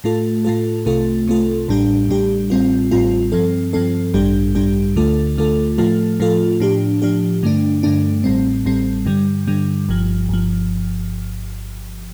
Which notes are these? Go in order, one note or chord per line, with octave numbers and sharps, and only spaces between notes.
A2 A3 F4 A4
A2 A3 F4 A4
C2 C3 A3 F4 A4
C2 C3 A3 F4 A4
A1 A2 G3 D4 G4
A1 A2 G3 D4 G4
A1 A2 G3 C4 F4
A1 A2 G3 C4 F4
G2 F3 C4 A4
G2 F3 C4 A4
A1 G2 G3 D4 G4
A1 G2 G3 D4 G4
D2 D3 A3 F4 A4
D2 D3 A3 F4 A4
A2 F3 A3 F4 A4
A2 F3 A3 F4 A4
A2 F3 D4 G4
A2 F3 D4 G4
G2 D3 A3 D4
G2 D3 A3 D4
A1 A2 G3 C4
A1 A2 G3 C4
G2 D3 G3
G2 D3 G3
G1 G2 F3
G1 F3